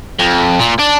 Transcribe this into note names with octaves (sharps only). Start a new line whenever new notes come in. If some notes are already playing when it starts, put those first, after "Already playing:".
F2
A#2
D4